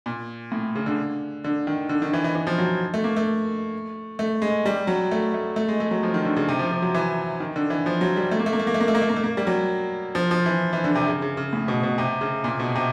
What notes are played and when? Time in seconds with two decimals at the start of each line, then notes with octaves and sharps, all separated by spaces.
0.06 A#2
0.52 A2
0.75 C#3
0.86 D3
1.44 D3
1.67 D#3
1.89 D3
2.02 D#3
2.13 E3
2.24 E3
2.35 E3
2.47 F3
2.58 F#3
2.94 A3
3.04 A#3
3.16 A3
4.19 A3
4.42 G#3
4.66 G3
4.87 F#3
5.11 A3
5.34 A3
5.56 A3
5.68 G#3
5.80 A3
5.91 F#3
6.03 F3
6.14 D#3
6.25 D3
6.36 C#3
6.48 C3
6.59 F3
6.72 F3
6.82 F#3
6.95 E3
7.40 D#3
7.56 D3
7.70 E3
7.86 F3
8.01 F#3
8.16 G3
8.31 A3
8.39 A#3
8.46 A3
8.53 A#3
8.60 A3
8.67 A#3
8.74 A3
8.80 A#3
8.88 A3
8.95 A#3
9.02 A3
9.09 A#3
9.16 A3
9.24 A#3
9.37 G3
9.47 F#3
10.15 F3
10.31 F3
10.46 E3
10.73 E3
10.84 D3
10.95 C3
11.07 C#3
11.22 C#3
11.37 C#3
11.53 A2
11.68 B2
11.83 B2
11.98 C3
12.21 C#3
12.44 A#2
12.60 B2
12.75 C3